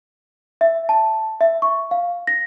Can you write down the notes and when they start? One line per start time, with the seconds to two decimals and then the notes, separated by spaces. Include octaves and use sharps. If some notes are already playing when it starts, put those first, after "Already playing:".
0.61 E5
0.89 A5
1.41 E5
1.62 C#6
1.91 F5
2.27 A#6